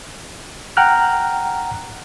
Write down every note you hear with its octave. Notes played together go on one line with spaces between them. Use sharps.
F#5 G5 A#5 F6 F#6